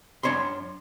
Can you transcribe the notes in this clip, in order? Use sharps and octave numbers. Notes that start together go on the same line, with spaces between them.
F#2 D4 C#5 B5 C6